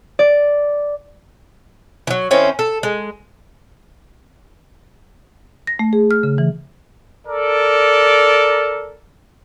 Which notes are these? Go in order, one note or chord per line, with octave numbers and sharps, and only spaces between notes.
D5
E3 F#3
D#3 C4 C#4 E4
A4
G#3
A#6
A3
G#4
F6
C#3
E3
A4 A#4 D5